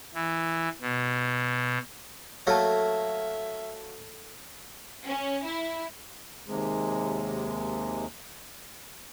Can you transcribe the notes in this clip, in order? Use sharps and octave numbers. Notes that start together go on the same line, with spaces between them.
E3
B2
F#3 A3 A#3 A4 C#5 E5 A5
C#4
E4
D#2 C3 G#3